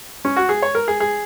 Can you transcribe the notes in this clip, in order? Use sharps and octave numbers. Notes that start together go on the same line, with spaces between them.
C#4
F#4
G#4
C#5
A#4
G#4
G#4